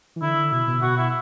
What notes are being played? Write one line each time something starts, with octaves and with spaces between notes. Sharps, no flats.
E3
D3 E4
B2 E4
B2
B2 F#4
E4